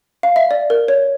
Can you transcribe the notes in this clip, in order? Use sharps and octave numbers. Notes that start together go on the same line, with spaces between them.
F5
E5
D5
A#4
C#5